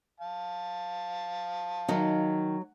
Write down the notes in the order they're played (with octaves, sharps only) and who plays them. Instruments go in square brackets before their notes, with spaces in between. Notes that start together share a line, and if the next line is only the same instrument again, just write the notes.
[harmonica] F5 A5
[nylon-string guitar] D#3 D#4 [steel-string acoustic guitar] F#3